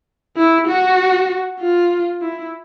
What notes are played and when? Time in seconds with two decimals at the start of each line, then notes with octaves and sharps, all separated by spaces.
0.37 E4
0.67 F#4
1.60 F4
2.22 E4